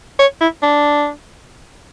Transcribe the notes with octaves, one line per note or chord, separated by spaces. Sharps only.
C#5
E4
D4